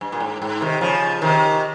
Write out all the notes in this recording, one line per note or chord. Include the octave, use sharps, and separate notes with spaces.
G2
A#2
G#2
G#2
C3 D#3
C#3 F3
C3 D#3